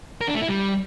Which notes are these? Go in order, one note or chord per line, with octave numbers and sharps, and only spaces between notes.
A#4
D4
A3
E4
G3